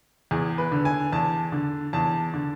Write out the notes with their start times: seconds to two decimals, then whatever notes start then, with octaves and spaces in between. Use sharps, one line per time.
0.31 E2 G#4
0.58 B4
0.72 D3
0.85 G#5
1.12 E2 A5
1.52 D3
1.93 E2 A5
2.34 D3